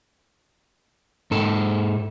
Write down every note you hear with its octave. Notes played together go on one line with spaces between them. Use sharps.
G#2 A4